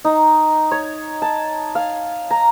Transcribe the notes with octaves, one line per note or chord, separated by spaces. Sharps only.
D#4
C#5
A5
F5
A#5